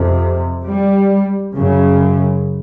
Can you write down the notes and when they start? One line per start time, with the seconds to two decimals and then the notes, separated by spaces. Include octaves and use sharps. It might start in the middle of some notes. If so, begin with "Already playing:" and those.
Already playing: F2 C3
0.65 G3
1.54 F#2 C#3